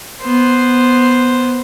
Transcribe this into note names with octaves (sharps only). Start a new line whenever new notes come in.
B3 C5